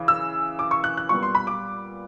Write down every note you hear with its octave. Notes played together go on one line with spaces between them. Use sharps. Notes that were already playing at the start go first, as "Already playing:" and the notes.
Already playing: C#3 E3
E6
D6
C#6
F#6
F#6
A#2 G3 B3 C#6
C6
B5
D6